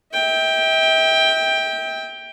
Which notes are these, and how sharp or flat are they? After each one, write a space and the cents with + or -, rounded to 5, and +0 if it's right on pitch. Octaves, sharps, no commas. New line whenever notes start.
E5 -40 G5 +10